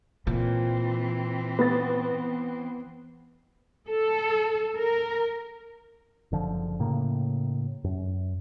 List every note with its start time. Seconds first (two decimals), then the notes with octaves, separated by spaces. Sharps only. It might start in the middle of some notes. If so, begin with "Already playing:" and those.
0.27 A#2 E3 C4
1.59 B3 B4 A6
3.89 A4
4.78 A#4
6.32 F#1 D3 F3
6.80 A2 C#3 A#3
7.84 F#2